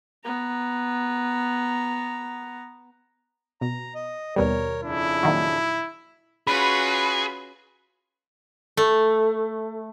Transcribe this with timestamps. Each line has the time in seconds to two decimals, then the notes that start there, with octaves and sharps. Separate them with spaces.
0.25 B3 A#5
3.61 B2 A#5
3.95 D#5
4.36 D#2 B2 G3 A#4 C#5
4.84 F2 C#3 D4 E4
5.23 A#2 D#3 F#3
6.47 C#4 F4 F#4 G#4 B4 B5
8.77 A3